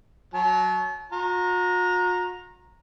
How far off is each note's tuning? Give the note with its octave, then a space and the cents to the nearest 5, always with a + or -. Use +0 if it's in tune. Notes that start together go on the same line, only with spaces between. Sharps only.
F#3 +0 A5 -40
F#4 -45 A#5 +0